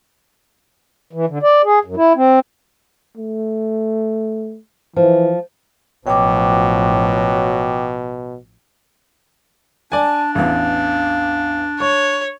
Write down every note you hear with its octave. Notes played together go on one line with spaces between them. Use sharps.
E3
D3
D5
G#4
F#2
E4
C4
A3
E3 F3
A1 B2 F3 F#3 G5 D6
D4 D5 G#5 A5
A1 E2 F5
C#5 C#6